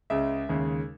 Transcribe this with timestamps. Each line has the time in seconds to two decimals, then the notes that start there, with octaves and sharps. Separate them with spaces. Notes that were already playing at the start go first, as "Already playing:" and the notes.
0.10 C#2 C#3 G#3 E5
0.49 D#2 C#3 G#3